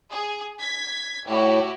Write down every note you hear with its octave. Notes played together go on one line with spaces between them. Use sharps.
G#4
G#6 B6
A2 E4 F#4 G4